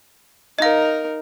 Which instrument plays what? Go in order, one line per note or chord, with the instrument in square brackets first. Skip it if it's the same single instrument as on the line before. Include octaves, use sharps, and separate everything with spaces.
[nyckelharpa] D#4 A#4 [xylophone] D#5 F5